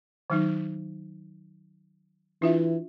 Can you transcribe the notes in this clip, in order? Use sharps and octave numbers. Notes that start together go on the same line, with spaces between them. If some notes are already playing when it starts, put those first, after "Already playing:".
D#3 F#3 D#4
E3 D4 F4 E5